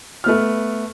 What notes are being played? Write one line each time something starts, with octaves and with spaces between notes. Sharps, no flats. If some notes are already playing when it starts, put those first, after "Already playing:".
A3 B3 F6